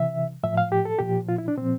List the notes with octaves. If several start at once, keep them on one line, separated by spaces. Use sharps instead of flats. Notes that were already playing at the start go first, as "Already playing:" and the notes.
Already playing: C3 E3 E5
A2 F3 E5
F5
G4
A4
A#2 F3 G4
F4
E4
D4
A#2 F3 C4